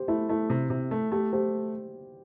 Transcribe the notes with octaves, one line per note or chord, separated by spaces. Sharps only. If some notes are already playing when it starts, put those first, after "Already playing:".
Already playing: G4 C5
A3 E4
A3 E4
C3
C3
A3
A3 G4
A3 G4 C5